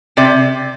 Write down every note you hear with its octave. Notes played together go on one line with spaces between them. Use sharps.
C3 D5